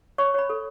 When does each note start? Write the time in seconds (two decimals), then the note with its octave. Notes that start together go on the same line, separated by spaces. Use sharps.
0.18 C#5 C#6
0.34 C#5 B5
0.49 A4